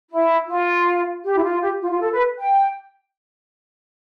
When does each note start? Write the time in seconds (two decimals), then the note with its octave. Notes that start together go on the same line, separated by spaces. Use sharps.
0.10 E4
0.48 F4
1.24 G4
1.36 E4
1.43 F4
1.62 G4
1.81 F4
1.91 F4
2.00 A4
2.13 B4
2.38 G5